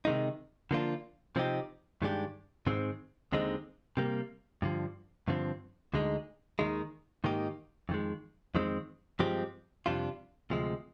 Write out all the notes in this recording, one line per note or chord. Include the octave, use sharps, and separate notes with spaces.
C3 D#3 G#3 D#4
D3 F3 A#3 D4 F4
C3 F3 C4 D#4 G4
G2 D#3 G#3 D4 G4
G#2 D#3 G#3 C4
D#2 D3 G#3 C4 D#4
C3 G3 A#3
G2 D3 F3
G2 D3 F3 C4
D2 D3 G#3 D#4
D#2 D#3 G#3 D#4
G#2 D#3 A#3 D#4 G4
F2 D#3 G#3
F2 D#3 G#3 C4
G2 F3 G#3 C4 G4
F2 C3 G3 D4 F4
D2 C3 F3 G#3